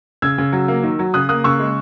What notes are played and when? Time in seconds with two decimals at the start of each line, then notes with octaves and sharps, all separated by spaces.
0.22 C#3 E6 G#6
0.38 C#3
0.53 F#3
0.68 A#3
0.83 D#3
0.99 F#3
1.14 C#3 D#6 F#6
1.29 A#3 D#6 F#6
1.44 C#3 C#6 E6
1.60 G#3